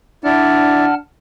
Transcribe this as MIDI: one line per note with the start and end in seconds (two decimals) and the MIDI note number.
0.24 0.98 62
0.24 0.85 64
0.24 0.85 74
0.24 0.94 78
0.24 0.94 81
0.24 0.94 89